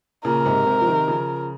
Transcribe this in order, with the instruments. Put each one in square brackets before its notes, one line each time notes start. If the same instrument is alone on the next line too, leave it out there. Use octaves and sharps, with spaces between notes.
[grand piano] A#2 C#3 [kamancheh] A#4
[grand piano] G#2 C3
G#2 C3
F3
C3 D#3
C#3 F3